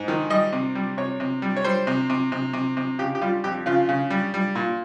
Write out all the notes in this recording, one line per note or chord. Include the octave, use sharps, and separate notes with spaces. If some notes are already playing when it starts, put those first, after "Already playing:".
Already playing: G#2
D#3
G3 D#5
C3
G3
C3 C#5
C3
G3
C#5
G3 C5
C3
C3
C3
C3
C3
C#3 G4
G4
G3 F4
F2 G4
C#3 F4
C#3
G3
G3
A#2